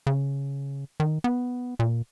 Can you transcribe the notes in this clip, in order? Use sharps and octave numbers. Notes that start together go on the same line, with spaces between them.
C#3
D#3
B3
A#2